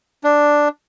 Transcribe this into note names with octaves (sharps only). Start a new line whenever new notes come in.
D4